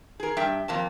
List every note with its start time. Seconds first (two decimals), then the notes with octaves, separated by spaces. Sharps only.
0.20 G#4 A#4
0.37 G2 E5 G5
0.68 F2 A#3 A5